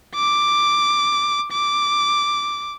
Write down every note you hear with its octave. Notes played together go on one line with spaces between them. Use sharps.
D6
D6